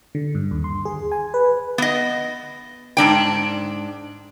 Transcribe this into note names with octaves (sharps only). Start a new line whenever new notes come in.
D3
G2
D#2
C6
G#4
G#5
B4
B3 D#5
G#2 C4 D4 G5